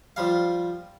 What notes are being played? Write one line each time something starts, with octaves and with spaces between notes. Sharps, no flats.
F3 G3 F5